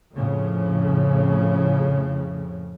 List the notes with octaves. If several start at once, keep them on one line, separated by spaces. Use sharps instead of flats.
F2 A2 C#3 F3